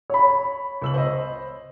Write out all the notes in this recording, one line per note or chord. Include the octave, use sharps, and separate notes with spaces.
C#5 B5
C#2 E6 F#7
C5 D#5